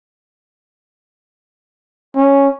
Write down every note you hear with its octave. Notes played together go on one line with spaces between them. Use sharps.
C#4